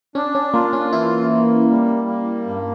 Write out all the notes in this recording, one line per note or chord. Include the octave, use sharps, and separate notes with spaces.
C#4 D4
C#4
A#3 F4
C#4
E3 E4
A#3
G3
A#3
G2